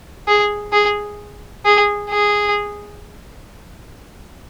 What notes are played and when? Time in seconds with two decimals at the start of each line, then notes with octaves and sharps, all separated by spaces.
0.28 G#4
0.72 G#4
1.65 G#4
2.10 G#4